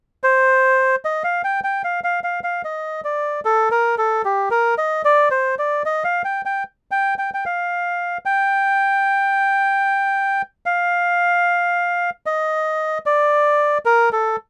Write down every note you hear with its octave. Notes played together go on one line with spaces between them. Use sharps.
C5
D#5
F5
G5
G5
F5
F5
F5
F5
D#5
D5
A4
A#4
A4
G4
A#4
D#5
D5
C5
D5
D#5
F5
G5
G5
G5
G5
G5
F5
G5
F5
D#5
D5
A#4
A4